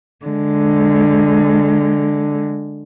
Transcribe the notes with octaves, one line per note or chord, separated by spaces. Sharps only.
D3 G#3